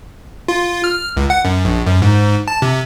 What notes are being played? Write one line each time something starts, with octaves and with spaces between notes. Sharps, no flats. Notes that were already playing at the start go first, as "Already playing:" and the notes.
F4
F6
C#2
F#5
F#2
A#1
F#2
G#2
A5
C3